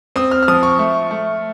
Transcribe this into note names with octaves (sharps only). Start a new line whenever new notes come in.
C4 D#6
F6
F6
F3 D#6
C#6
A3
A3